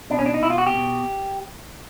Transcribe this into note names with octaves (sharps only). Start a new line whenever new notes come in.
B2 D4
C#4
D4
D#4
B2 E4
F4
F#4
G4
B2